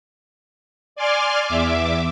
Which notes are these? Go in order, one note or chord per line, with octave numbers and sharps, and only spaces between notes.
D5 G#5 C6 D6 F6
E2 E5 D6